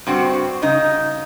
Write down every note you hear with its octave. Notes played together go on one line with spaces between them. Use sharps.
G2 C4 F#4
C#3 D#4